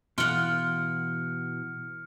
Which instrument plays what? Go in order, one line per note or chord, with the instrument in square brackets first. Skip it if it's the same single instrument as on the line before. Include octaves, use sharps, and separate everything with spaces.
[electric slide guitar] B2 E3 [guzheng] F4 F#5 [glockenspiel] F6 C#7 D7